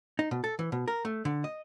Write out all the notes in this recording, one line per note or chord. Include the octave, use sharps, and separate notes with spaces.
D#4
B2
A4
E3
B2
A#4
A3
D3
D#5